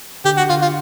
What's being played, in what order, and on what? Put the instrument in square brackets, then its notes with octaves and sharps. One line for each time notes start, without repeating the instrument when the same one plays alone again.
[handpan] D3 [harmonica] G4
[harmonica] F#4
[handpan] D3 [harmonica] F4
[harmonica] F4